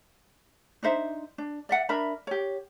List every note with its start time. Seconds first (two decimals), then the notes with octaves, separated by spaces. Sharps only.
0.83 D4 D#4 C5 E5
1.38 D4
1.69 D5 E5 F#5
1.89 D4 A#4 E5 B5
2.27 G4 C#5